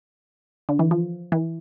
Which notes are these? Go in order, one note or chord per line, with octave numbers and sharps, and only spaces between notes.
D3
E3
F3
E3